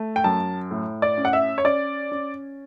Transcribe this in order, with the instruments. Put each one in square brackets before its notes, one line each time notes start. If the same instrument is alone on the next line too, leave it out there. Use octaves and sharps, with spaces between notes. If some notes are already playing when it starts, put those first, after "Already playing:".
Already playing: [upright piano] A3
G5
F#2 A5
A2
D5
C#4
F#5
E5
C#5
C#4 D5
C#4